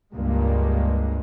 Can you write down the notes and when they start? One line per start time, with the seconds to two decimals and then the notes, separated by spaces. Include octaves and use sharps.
0.14 C#2 G2 G#3 A#3